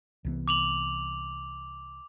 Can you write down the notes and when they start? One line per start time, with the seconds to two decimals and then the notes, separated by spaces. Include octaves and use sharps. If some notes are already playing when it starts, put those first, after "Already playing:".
0.25 C2 E3 B3
0.48 D6 F7 F#7